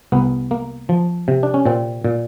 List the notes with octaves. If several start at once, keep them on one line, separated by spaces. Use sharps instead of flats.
C2 B3
A#3
F3
C3
D4
C#4
A#2 C4
A#2